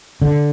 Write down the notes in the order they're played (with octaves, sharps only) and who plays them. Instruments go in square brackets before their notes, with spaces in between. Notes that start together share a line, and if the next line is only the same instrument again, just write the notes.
[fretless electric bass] D3